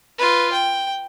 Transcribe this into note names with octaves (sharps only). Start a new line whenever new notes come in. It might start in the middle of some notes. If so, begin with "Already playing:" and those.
F4 B4
G5